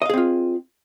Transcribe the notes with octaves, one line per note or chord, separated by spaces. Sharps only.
C4 F4 G#4 D#5 F5